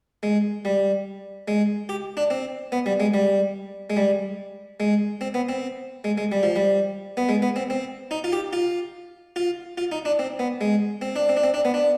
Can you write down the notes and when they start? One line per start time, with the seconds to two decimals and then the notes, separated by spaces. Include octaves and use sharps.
0.23 G#3
0.65 G3
1.48 G#3
1.89 G4
2.17 D4
2.30 C4
2.72 B3
2.86 G3
3.00 G#3
3.14 G3
3.90 G#3
3.97 G3
4.80 G#3
5.21 C4
5.34 B3
5.49 C4
6.04 G#3
6.18 G#3
6.32 G3
6.43 F3
6.56 G3
7.17 B3
7.29 G#3
7.42 B3
7.56 C4
7.70 C4
8.11 D#4
8.24 F4
8.33 G4
8.53 F4
9.36 F4
9.78 F4
9.92 D#4
10.05 D4
10.19 C4
10.39 B3
10.61 G#3
11.02 C4
11.16 D4
11.29 C4
11.37 D4
11.44 C4
11.54 D4
11.65 B3
11.74 D4